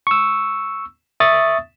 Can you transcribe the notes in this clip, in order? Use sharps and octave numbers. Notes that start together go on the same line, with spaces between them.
C#6 E6
E5 C#6 D#6 A6